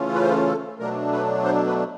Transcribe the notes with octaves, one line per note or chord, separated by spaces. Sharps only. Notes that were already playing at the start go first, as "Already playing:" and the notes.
Already playing: C#3 E3 A3 C#4 F4
B4
C5
B4
A4
B2 F#3 A3 D4 A#4
B4
C5
B4